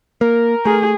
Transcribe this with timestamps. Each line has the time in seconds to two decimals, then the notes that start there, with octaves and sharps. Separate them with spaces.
0.21 A#3 A#4
0.65 A3 G#4